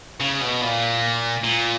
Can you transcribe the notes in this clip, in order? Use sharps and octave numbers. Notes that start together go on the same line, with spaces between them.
C#3
B2
A#2
A#2